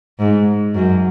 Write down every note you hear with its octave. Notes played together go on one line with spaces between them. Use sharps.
G#2
F#2